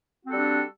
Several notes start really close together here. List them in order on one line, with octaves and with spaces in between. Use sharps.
F#4 C4 A4 G3 D4